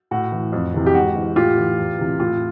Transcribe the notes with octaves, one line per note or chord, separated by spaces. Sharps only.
A2 F#4
E3
F2
C3 E3
G4
G#2 F#4
E3
A2 F4 G4
E3
E2
C3 E3
A2 F4